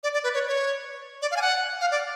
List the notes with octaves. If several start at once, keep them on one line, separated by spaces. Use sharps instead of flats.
D5
D5
B4
C#5
C#5
D5
F5
G#5
F#5
F5
D5